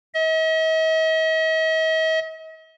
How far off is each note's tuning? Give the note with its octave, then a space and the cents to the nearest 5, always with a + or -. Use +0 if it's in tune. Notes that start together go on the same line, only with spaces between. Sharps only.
D#5 +45